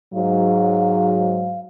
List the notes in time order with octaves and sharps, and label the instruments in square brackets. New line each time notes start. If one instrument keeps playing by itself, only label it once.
[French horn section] G#2 F#3 [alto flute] F5